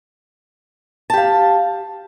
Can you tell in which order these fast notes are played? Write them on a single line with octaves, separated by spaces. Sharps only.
A5 G4 F5